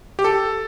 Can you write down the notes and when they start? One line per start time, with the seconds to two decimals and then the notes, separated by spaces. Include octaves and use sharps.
0.19 G4
0.24 A4